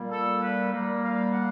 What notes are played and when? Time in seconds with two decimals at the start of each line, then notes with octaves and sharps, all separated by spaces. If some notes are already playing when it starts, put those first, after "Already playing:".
Already playing: A#2 G3 A#3
0.11 A4
0.42 B4
0.72 A#2 G3 A#3
1.03 F5
1.32 F#5